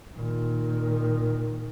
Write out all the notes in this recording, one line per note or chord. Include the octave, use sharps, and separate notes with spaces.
A#2 D#3